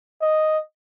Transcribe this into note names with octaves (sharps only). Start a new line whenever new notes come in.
D#5